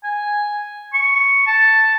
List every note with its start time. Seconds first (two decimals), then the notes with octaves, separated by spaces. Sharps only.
0.04 G#5
0.94 C#6
1.47 A5